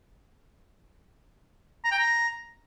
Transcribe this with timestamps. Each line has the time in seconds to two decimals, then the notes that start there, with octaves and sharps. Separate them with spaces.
1.84 A#5
1.91 G5
1.98 A#5